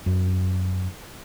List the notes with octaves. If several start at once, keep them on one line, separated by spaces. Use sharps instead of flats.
F#2